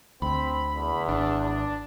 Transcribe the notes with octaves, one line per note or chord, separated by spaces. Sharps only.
D2 C4 B5
E2
G#1 D4